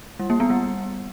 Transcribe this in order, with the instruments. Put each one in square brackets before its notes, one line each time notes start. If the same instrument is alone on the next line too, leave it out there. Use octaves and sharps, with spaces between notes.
[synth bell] G3
A#3
B3
G3